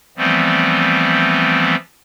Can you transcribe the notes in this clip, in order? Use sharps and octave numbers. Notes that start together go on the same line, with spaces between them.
E3 F3 G3 A3 B3 C4